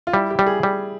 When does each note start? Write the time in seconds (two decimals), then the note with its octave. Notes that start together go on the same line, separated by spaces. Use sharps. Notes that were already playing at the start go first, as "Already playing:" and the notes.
0.07 F4
0.14 G3 E4
0.31 G4
0.39 G3
0.46 G#4
0.63 G3